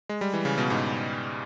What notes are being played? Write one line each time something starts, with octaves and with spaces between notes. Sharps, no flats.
G#3
G3
E3
C#3
B2
G#2